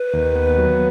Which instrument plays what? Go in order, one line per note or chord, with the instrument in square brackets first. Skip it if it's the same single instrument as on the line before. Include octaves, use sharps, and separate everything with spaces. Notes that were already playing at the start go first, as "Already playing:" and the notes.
Already playing: [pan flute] B4
[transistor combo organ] D#2
B3
F#3